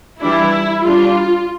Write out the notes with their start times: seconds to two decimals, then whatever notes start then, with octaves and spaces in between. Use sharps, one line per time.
0.21 E3 G3 D4 E4
0.84 G3 D4 F4